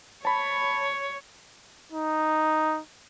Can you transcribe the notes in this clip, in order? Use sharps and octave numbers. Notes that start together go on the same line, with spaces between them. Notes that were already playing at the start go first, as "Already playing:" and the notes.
C#5 A5 B5
D#4